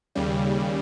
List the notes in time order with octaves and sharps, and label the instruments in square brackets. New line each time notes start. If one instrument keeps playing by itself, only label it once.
[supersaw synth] D#2 C#3 G3